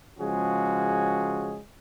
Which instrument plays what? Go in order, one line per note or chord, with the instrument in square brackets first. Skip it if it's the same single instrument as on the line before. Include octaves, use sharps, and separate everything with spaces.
[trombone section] C#3 F3 G#3 C#4 F#4 G#4